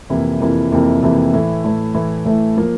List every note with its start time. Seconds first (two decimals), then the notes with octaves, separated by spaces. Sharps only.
0.10 F2 C3 E3 A#3 E4
0.40 F2 C3 E3 A#3 E4
0.71 F2 C3 E3 A#3 E4
1.03 F2 C3 E3 A#3 E4
1.33 A2 E3 A3 E4
1.64 A2 E3 A3 E4
1.94 A2 E3 A3 E4
2.25 A2 E3 A3 E4
2.57 F3 A#3